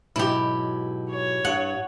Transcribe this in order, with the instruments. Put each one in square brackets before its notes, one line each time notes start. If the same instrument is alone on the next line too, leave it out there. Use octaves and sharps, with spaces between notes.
[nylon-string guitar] G#2 B2 F#3 [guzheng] E4 G4
[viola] C#5
[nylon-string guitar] G2 [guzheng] F#5